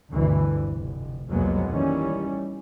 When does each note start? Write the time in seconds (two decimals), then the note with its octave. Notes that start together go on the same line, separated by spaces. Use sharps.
0.12 G1 D2 G2 B2 D3 E3
0.69 F1
1.30 C2 F2 F#3 G#3 A#3 B3
1.69 A1 D#3 E3 G3 C#4